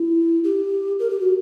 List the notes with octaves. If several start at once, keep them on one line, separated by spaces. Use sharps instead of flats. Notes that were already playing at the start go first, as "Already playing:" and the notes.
Already playing: E4
G4
A#4
G4
F#4